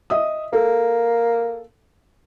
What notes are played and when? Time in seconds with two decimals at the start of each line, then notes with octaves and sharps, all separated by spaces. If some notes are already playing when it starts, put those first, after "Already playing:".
0.10 D#5 E5 D#6
0.53 A#3 A4